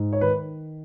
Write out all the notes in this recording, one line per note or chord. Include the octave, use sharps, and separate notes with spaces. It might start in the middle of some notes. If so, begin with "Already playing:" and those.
Already playing: G#2
C#5
D#3 B4